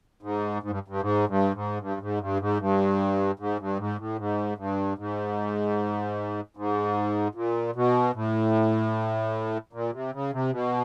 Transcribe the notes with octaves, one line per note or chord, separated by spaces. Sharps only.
G#2
G#2
G2
G2
G#2
G2
G#2
G2
G#2
G2
G#2
G2
G#2
G2
G#2
A2
G#2
G2
G#2
G#2
A#2
B2
A2
A#2
C3
C#3
C3
B2